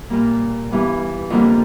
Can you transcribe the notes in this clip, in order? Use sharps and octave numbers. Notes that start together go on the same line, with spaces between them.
A#2 G3 A#3
G2 E3 G3 B3
F2 D3 G3 A#3